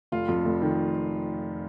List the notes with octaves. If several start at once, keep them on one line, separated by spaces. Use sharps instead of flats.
F1 F4
F2
F1
D#3